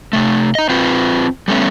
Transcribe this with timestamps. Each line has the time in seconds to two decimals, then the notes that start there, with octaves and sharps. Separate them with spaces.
0.13 C3 A3
0.55 D#4 D#5
0.70 C4 F4 B4
1.48 G3 A3 B3 C#4